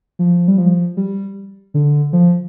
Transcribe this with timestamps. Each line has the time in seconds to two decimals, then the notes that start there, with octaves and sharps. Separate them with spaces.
0.19 F3
0.48 G3
0.58 F3
0.97 G3
1.74 D3
2.13 F3